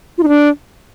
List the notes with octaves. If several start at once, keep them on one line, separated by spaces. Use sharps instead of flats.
F4
D#4
D4